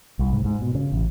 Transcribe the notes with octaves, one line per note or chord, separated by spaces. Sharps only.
C2
G#2
G#2
B2
C#3
A1